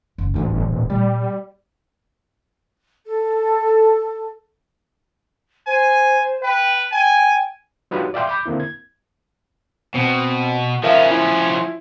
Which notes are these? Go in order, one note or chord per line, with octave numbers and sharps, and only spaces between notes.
F#1
A1 D2 A#3
G1
D#1
A#2 G3
A4
C5 G#5
B4 G5
G5 G#5
F#3 D4 D#4 F4 G4 B4
D5 E5 F5 G5 C6 D6
B5 D6 G6
D3 A#3 C4 E4
G#6
B2 C4
F3 C#4 A#4 E5 F5
E4